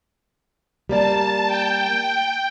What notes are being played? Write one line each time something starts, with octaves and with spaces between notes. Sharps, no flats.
G3 A#3 D5 A5
G5